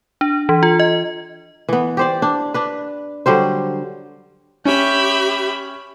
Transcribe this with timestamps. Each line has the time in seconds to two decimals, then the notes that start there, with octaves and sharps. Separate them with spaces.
0.21 D4
0.49 E3
0.63 F4
0.80 D#5
1.69 E3 B3
1.97 G4 C5 D5
2.22 D4
2.54 D4 B4
3.26 D3 F#3 G3 C5
4.65 C#4 G4 E5 B5